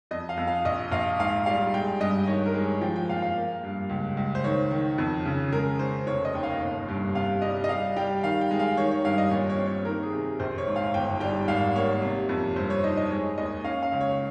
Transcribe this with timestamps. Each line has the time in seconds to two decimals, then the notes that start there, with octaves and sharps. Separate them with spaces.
0.11 F2 D#5
0.29 F5
0.37 F2
0.47 F5
0.65 A#1 D#5
0.92 A#1 F5
1.19 G#2 F5
1.46 G3 F5
1.74 G#3 G5
2.00 G2 D#5
2.27 D#3 C#5
2.46 A#4
2.54 G#3
2.64 C#5
2.81 F3 G5
2.96 G5
3.09 A#2 F5
3.22 F5
3.36 A#3
3.63 G2
3.89 C#2
4.17 C#2
4.35 C5
4.44 D#3 C#5
4.71 D#3
4.98 F2
5.25 C#3
5.53 G#3 A#4
5.79 C#4 C5
6.07 F1 C#5
6.25 D#5
6.34 D#2 G5
6.43 F5
6.60 G1
6.88 G2
7.15 C3 F5
7.42 G3 D#5
7.64 D#5
7.69 G3 F5
7.96 G3 G5
8.23 D#3 F5
8.41 G5
8.51 G#3
8.59 F5
8.77 D#3 C#5
8.91 C#5
9.04 G2 F5
9.18 D#5
9.31 A#2 C#5
9.50 C#5
9.58 C4
9.67 C#5
9.85 D#3 A#4
10.03 G#4
10.13 C3
10.40 A#1 C5
10.58 C#5
10.67 G#2
10.76 F5
10.94 G1 G5
11.20 G3 G5
11.48 G#1 F5
11.75 A#3 C#5
12.02 C3
12.29 F2
12.56 G2 C5
12.70 C#5
12.84 D#4 D#5
12.97 D#5
13.10 G#3 C#5
13.38 D#2 D#5
13.64 C#4 F5
13.83 F5
13.92 C#2
14.01 C#5